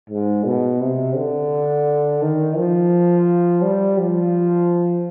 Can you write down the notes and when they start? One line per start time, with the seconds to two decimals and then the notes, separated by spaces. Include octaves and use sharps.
0.10 G#2
0.45 B2
0.81 C3
1.16 D3
2.22 D#3
2.57 F3
3.62 G3
3.99 F3